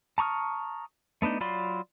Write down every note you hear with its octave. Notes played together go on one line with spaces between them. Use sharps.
A5 A#5 C#6 D#6 F6
A3 B3 D4 D#4
F#3 F4 D5 B5 C6